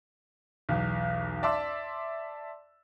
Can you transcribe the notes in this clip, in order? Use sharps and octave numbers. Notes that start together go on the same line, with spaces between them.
B1 E2
D5 E5 A5 C6 D6 E6